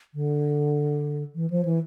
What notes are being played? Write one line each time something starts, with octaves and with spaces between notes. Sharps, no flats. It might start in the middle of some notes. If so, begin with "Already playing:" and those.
D3
E3
F3
E3